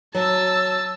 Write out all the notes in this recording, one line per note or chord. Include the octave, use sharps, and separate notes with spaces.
F#3 A5 E6